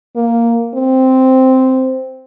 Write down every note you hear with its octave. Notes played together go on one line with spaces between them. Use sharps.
A#3
C4